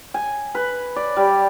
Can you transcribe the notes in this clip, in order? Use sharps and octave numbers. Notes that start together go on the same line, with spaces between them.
G#5
B4
D5
G3